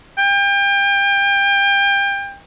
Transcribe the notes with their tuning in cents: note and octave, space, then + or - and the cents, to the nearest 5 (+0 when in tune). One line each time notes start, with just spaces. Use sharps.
G5 +30